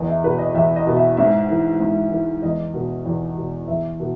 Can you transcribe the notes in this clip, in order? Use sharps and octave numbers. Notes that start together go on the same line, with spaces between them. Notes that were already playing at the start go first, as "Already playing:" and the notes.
Already playing: E2 D#5
E5
B2 B4
D#5
E2 E5
D#5
B2
E5
G#2 E5
E3
G#2
E3
E2 D#5
B2
E2
B2
E2 E5
B2